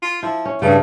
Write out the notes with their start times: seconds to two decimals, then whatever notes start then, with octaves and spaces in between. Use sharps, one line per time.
0.03 F4
0.23 F3 E4
0.45 C#4
0.62 G2 C#3 A3